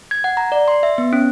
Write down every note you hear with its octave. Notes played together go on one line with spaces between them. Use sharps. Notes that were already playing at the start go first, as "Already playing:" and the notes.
G#6
F#5
A#5
D5
C6
E5
B3
C#4